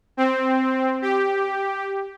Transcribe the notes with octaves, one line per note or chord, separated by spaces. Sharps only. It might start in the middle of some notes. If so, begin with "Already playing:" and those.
C4
G4